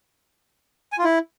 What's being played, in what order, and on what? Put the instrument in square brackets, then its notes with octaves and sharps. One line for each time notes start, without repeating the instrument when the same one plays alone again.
[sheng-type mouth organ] G#5
F4
E4